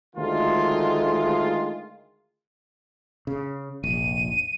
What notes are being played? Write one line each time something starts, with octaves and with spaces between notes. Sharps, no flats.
D2 D#3 G#3 A3 F4
C#3
F1 A#1 D#7